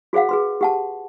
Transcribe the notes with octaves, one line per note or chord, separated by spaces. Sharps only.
F#4 G#4 C5 F5 F#5
G#4 B4 C6
G4 F#5 A5